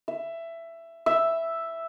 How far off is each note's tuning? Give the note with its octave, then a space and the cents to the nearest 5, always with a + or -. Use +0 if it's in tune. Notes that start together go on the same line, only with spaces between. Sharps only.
E5 +15
E5 +0